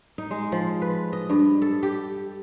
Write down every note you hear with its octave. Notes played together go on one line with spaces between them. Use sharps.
D#4
G#3
F3
B4
D#5
G2
A4
G4